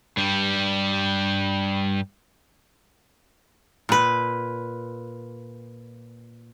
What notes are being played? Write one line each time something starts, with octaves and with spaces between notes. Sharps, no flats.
G2 G3
A#2 B4